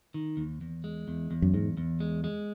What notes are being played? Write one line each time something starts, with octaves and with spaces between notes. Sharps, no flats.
D#3
D#2
E2
G#3
E2
E2
F#2
E2 G#2
E2
G#3
G#3